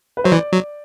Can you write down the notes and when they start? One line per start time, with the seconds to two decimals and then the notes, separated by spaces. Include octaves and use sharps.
0.17 B4
0.24 F#3 C5
0.32 E3 D5
0.53 F#3